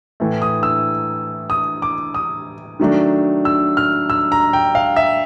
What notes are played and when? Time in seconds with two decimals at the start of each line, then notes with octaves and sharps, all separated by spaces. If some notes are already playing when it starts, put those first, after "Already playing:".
0.20 A2 E3 A3
0.42 D#6
0.63 E6
1.50 D#6
1.82 D6
2.14 D#6
2.80 D#3 F#3 A3 D4
3.45 E6
3.77 F6
4.10 E6
4.32 A#5
4.53 G5
4.75 F5
4.96 E5